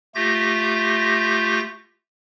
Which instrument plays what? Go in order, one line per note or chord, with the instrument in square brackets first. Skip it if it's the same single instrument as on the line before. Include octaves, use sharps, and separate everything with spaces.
[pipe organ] A3 F4 G4 G6 A#6